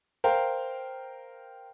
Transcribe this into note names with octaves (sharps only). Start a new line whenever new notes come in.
A#4 C5 F5 G5